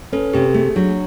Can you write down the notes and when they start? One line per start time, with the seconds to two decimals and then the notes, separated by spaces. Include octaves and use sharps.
0.12 C#4 A4 B4
0.33 C3 G4 A4
0.54 A3 G#4
0.76 F#3 D4